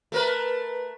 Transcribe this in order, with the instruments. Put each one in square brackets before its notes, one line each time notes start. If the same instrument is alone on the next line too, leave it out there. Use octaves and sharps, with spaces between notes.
[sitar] A3 A#4 B4